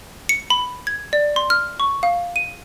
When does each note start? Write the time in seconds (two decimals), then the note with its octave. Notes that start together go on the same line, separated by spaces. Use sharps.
0.29 C#7
0.50 B5
0.87 G#6
1.13 D5
1.36 C6
1.50 F6
1.80 C#6
2.03 F5
2.36 D#7